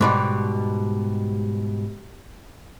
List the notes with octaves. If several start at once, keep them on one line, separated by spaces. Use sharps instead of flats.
G#2 B2 G3